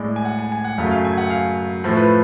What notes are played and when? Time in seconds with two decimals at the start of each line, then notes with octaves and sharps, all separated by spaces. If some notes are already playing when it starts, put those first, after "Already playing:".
Already playing: A2 G#3 D5
0.16 G#5
0.25 F#5
0.39 G#5
0.52 G#5
0.64 F#5
0.78 F#2 C#3 F#3 A3 F5
0.91 F5
1.05 G#5
1.17 F#5
1.30 F5
1.84 A2 F3 A3
1.97 B4